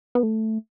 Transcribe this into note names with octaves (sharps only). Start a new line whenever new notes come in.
B3
A3